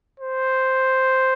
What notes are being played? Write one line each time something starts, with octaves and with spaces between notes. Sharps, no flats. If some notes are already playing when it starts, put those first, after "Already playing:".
C5